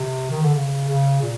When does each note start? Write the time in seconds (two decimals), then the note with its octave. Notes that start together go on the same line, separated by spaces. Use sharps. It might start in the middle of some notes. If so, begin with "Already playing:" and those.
Already playing: C3
0.31 D#3
0.43 D3
0.54 C#3
0.88 C#3
1.22 A#2